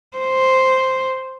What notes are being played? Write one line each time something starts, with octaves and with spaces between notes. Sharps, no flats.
C5